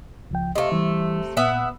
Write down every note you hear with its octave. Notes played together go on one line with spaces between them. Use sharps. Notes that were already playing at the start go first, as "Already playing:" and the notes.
C#2 F3 G5
C3 A3 D#5 F5
E3 G3
A#2 B3 E5 F#5